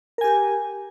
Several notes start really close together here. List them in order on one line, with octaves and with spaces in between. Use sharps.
A#4 G#5 G4